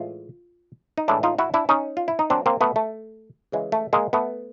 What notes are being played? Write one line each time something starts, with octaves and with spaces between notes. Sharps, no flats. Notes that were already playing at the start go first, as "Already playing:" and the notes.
Already playing: A2 E3 G#3 F4
D#4
A2 E3 G#3 D4 E4
D#4 F4
E4 F#4
D4 E4
C#4 D#4
F4
E4
D#4
A#2 F#3 C4 D4
A#3 C4
A3 B3
A3
C#3 E3 G#3
A3
G#3 A#3
A3 B3